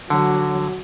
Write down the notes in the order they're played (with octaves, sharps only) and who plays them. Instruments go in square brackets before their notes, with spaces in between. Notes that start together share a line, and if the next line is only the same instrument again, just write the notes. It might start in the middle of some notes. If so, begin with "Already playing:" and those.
[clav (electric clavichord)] D3 [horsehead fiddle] F#3